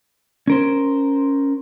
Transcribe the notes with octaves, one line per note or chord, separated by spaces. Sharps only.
C#4 A#4 C5